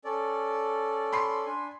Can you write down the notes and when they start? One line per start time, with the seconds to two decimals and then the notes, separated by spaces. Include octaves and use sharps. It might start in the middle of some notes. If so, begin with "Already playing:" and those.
0.05 C#4 A4 D5
1.12 B5 C6 C7
1.46 D4 G#5